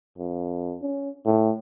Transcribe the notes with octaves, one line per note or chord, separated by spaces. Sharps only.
F2
C#4
A2